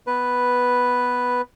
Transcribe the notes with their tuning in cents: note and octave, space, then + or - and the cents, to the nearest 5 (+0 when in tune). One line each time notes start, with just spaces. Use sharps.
B3 +0 B4 +0